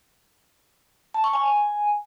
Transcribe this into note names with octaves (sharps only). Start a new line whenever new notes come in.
A5
C#6
G#5